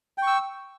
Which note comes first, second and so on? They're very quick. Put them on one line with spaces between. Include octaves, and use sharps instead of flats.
G5 C#6 E6